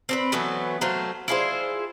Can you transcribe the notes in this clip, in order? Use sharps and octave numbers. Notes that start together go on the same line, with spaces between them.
C4 D4 B4
E3 F#3 A3 B3
F#3 A3 C5 F5
E4 F4 G#4 C5